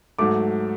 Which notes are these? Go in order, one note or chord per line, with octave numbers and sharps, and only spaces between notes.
G#2 F#3 A3 D6